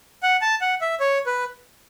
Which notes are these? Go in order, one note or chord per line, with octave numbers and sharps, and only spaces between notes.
F#5
A5
F#5
E5
C#5
B4